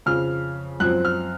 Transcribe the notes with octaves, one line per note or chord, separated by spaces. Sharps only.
F2 C#3 F3 F6
F#2 F3 C4 F#6
F6